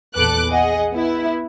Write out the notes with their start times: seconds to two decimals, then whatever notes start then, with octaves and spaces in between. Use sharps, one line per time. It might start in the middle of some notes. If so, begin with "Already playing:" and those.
0.15 A#1 E2 A4 B4 D6 F#6
0.49 G#4 D#5 F#5
0.92 B3 E4